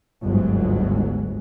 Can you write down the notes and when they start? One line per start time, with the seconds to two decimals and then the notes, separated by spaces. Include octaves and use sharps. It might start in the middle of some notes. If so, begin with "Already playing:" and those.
0.23 G1 D2 G#2 F#3